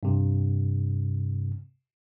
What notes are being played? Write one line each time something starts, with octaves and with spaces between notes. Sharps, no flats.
G2 C3